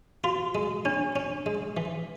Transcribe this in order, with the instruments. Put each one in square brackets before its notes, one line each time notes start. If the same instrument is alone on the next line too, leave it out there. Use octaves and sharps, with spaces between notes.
[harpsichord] F4 [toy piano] F#4
[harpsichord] G#3
[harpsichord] C#4 [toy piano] D4
[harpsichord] C#4
G#3
E3